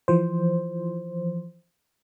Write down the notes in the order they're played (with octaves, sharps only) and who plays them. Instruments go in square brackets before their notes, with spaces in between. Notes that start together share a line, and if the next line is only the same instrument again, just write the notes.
[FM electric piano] E3 F3 C5